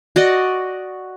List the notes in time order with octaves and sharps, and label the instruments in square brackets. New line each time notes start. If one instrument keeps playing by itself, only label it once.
[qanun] F#4 D5 D#5